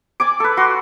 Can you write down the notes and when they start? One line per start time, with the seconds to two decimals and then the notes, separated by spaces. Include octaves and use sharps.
0.20 D5 G#5 D6
0.40 A4 B4
0.57 F#4 C6